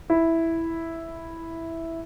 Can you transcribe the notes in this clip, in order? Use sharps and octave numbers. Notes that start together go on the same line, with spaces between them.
E4